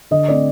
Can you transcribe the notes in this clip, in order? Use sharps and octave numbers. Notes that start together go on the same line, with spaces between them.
D3 D#5
A3 C4 D5